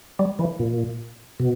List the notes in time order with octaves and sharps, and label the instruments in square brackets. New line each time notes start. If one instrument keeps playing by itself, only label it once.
[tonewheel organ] G3
E3
A#2
B2